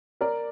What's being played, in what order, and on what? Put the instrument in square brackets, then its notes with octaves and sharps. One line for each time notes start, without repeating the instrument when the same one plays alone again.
[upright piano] A#4 D5